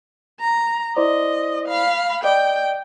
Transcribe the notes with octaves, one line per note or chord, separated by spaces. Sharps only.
A#5
E4 C5 D5 D#5
F5 B5
D5 D#5 G5